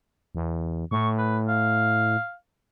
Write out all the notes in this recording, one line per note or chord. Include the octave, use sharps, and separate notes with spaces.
E2
A2 C#6
B4
F5